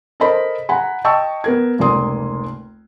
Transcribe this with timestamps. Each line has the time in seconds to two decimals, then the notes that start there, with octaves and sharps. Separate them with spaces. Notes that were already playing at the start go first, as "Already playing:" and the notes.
0.20 A4 A#4 C5 D#5 B5
0.69 F#5 G#5 A#5 B5
1.04 D#5 G5 A5 C#6 E6
1.44 B3 A#4 G#6
1.79 F1 C#2 A#3 D5 C6 D#6